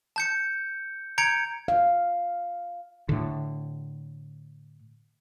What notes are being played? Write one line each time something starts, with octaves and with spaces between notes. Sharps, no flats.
A5 G6 C#7
A#5 G6 G#6 C#7 D7
F5
A2 D3